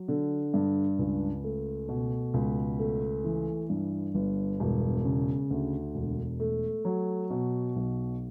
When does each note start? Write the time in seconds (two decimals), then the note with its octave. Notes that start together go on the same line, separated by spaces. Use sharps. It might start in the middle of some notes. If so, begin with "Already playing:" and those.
Already playing: F#3
0.08 D3
0.54 G2
0.99 C#2
1.44 A3
1.89 B2
2.34 C#2
2.79 A3
3.24 E3
3.70 G2
4.15 G1
4.60 E1
5.05 C#3
5.50 D2
5.95 E1
6.40 A3
6.85 F#3
7.30 B2
7.76 B1